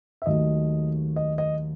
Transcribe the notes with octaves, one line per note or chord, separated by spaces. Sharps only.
E5
D#2 D#3 F#3 A3 D#5
D#5
D#5